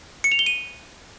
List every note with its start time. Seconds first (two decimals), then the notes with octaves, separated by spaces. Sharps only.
0.24 C#7
0.32 F7
0.39 G7
0.46 D#7